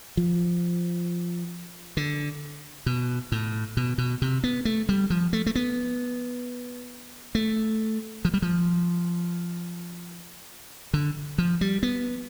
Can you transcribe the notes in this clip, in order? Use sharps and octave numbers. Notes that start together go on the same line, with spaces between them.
F3
D3
B2
A2
B2
B2
C3
B3
A3
G3
F3
A3
A3
B3
A3
F3
G3
F3
D3
F3
G3
B3